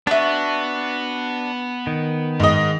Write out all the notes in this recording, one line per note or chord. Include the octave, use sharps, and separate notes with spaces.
B3 D4 F#4 E5 C#6
D#3
G#2 D#5